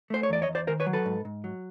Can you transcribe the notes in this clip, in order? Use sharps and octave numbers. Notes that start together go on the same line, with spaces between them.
A3 C5
C#5
E2 D5
C#5 D#5
E2
C5 D5
D#3 A#4 C5
B4 C#5
F#3
A4 B4
G#2
G#2
F#3